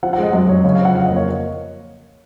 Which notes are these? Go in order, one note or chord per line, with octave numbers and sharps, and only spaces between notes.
F3 F#5
F#5
G#3 D#5
F#2
F#2 C#5
C#3 C#5
F5
F3
F#5
F2 F5
D#5
A#3
C#5